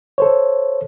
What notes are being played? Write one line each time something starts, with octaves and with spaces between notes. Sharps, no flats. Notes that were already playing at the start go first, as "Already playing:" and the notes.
A4 C5 C#5